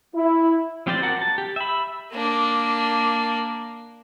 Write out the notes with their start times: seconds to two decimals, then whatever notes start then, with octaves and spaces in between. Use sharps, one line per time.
0.15 E4
0.86 F3 C4 G4 C5 D5
1.02 F#4 A#4 F#5 A5
1.22 A5
1.38 G4
1.56 E5 B5
2.12 A#3 D4